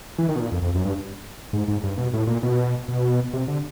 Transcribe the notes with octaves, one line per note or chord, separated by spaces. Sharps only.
E3
D#3
B2
A#2
F2
F2
F#2
G2
G#2
G#2
G2
B2
A2
A#2
B2
B2
C3
D3